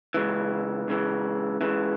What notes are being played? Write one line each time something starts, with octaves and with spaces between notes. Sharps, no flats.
C#2 C#3 E3
C#2 C#3 E3
C#2 C#3 E3